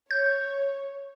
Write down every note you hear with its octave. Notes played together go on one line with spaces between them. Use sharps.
C#5 G6